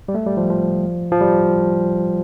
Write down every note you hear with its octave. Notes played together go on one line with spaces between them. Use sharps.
G3
A3
G3
F3
F3
F3
G3